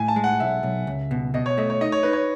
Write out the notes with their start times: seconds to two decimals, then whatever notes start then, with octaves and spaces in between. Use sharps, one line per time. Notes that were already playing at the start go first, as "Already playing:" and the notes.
Already playing: A2 G#5
0.08 A5
0.16 G#3
0.24 F#5
0.40 B1 E5
0.63 B1
0.87 C#2
1.11 B2
1.34 B2 D#5
1.46 C#5
1.58 A3 D#5
1.70 C#5
1.81 D#4 D#5
1.92 C#5
2.03 D#4 B4
2.13 C#5